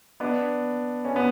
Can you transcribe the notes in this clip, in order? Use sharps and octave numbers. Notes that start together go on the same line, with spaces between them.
B3 D4
C#4
B3